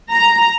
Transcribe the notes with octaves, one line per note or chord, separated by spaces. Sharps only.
A#5